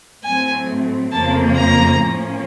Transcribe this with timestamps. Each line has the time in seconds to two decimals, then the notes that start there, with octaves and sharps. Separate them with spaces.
0.24 A2 F#3 A3 C4 G#5
1.12 F2 C#3 F3 A#3 A5
1.56 A#5
2.00 A2 F3 A#3 C#4